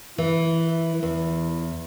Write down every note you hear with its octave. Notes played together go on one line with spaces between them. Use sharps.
E3 E4
E2